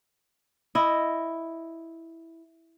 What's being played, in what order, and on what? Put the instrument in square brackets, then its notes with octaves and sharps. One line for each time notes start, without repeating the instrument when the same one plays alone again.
[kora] E4 D#5